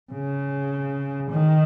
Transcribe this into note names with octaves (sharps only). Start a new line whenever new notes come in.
C#3
D#3